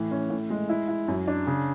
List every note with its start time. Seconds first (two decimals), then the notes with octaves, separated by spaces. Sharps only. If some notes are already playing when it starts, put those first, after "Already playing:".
Already playing: A2 E3
0.11 C#4
0.30 A2
0.50 G#3
0.69 E4
0.88 E4
1.08 F#2
1.27 D4
1.47 C#3